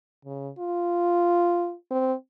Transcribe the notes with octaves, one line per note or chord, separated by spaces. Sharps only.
C#3
F4
C4